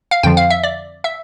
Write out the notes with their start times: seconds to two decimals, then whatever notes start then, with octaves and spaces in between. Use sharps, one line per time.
0.11 F5
0.23 F2 D3 F3 G5
0.37 F5
0.50 E5
0.63 D5
1.04 E5